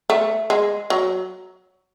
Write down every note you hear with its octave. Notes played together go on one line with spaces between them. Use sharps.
A3
G#3
F#3